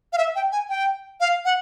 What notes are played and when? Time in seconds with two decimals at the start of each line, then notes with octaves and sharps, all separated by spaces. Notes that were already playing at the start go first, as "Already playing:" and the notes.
0.13 F5
0.18 E5
0.35 G5
0.52 G#5
0.69 G5
1.20 F5
1.45 F#5